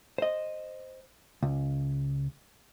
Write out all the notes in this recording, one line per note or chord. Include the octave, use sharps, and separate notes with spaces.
C5 D#5
C#2